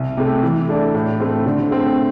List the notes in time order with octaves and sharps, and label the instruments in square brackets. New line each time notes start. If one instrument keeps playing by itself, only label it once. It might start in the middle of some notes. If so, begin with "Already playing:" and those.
Already playing: [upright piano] C2
C3 A3
E3
A3 D4
A2
A3 C4
D3
A3 C4